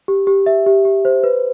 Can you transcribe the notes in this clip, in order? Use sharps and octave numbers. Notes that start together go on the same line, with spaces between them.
G4
G4
E5
G4
G4
C5
B4